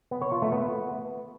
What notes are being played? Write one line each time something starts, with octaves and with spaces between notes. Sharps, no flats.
B3
C#5
F4
A3
B3